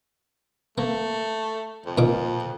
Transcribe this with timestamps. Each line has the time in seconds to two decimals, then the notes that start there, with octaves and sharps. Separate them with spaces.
0.78 A3 A#3
1.86 F2
1.98 A#2 D#3 D6